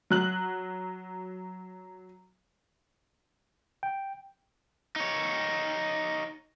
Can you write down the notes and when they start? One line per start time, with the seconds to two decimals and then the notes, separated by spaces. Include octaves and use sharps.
0.10 F#3 F#6 F#7
3.83 G5
4.96 D#4 C#5